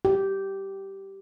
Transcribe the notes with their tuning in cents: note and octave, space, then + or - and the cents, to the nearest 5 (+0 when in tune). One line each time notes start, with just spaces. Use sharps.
G4 -10